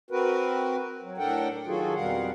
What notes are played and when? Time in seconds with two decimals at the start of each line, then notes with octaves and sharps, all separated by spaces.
0.11 C4 F#4 A#4 B4
1.02 F#3
1.18 A2 D4 A4 A#4 F#5 G5
1.67 D#3 F#3 F4 F#4 G#4 A4
1.95 F2 B2 G3 A#4 F5 F#5